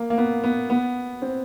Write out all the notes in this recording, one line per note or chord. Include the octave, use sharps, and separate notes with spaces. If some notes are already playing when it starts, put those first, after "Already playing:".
Already playing: A#3
A#3
B3
B3
B3
C4